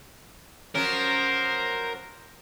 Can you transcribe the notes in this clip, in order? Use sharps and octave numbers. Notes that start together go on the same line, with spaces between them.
F3 F#3 C#4 A#4 C5